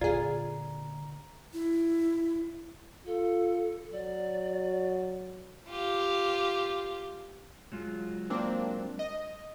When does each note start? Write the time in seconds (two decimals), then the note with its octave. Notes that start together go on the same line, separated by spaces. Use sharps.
0.01 A#2 D3 F4 G#4 D5 A#5
1.54 E4
3.06 F4 A4
3.92 F#3 D5
5.69 F4 G4
7.72 F#3 G#3 F4
8.30 A#3 C4 D4
8.99 D#5